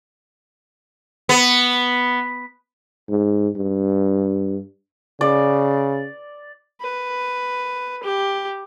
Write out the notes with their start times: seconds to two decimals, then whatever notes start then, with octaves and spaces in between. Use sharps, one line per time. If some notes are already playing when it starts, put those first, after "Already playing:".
1.29 B3
3.09 G#2
3.56 G2
5.21 C#3 D5
6.81 B4
8.03 G4